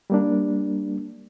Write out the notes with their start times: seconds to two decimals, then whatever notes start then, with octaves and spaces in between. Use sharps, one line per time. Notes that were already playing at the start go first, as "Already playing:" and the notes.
0.10 G3 A#3 D4